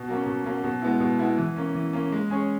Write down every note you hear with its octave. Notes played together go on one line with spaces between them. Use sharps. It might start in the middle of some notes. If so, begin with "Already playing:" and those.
Already playing: B2
F#3 A#3 C#4
B2
F#3 A#3 C#4
B2
G#3 B3 E4
B2
G#3 B3 E4
E3
A#3 C#4
E3
A#3 C#4
G#3
C#4 G#4 C#5